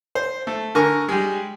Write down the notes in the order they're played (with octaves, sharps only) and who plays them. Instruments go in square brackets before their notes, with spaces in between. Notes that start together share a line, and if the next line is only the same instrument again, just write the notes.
[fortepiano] C5
A3
D3 A#4 G#5 C#6
G3 G#3